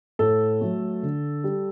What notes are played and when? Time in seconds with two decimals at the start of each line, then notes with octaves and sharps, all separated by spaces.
0.19 A2 A4
0.61 F#3 A3
1.03 D3
1.44 G3